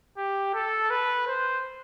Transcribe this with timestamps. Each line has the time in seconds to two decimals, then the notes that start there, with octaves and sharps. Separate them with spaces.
0.18 G4
0.54 A4
0.90 B4
1.27 C5